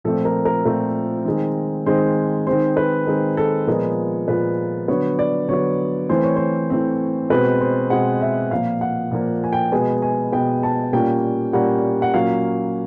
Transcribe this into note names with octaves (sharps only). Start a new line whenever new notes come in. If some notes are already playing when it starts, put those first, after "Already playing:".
A#2 F3 A3 C4 A4
A#4
A#4
A#2 F3 A3 C4 A#4
D#3 G#3 C4
D#3 G#3 C4 C5
D#3 G#3 C4 C5
B4
D#3 G#3 C4 A#4
A4
A#2 F3 G#3 B3 A#4
A#2 F3 G#3 B3 B4
D3 F#3 B3 C#5
D5
D3 F#3 B3 C#5
E3 A3 C4 C5
C#5
C5
E3 A3 C4
B2 G#3 C4 B4
C5
B2 G#3 C4 F#5
E5
A#2 F3 A#3 F5
F#5
A#2 F3 A#3
G#5
G5
B2 G#3 B3 G#5
G#5
B2 G#3 B3 G5
A5
A#2 G3 A#3 C#4 G5
A#2 G3 A#3 C#4 F#5
F#5
A#2 F#3 A#3 C#4 F5